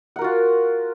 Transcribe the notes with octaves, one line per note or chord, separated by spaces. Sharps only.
F4 F#4 A#4 F#5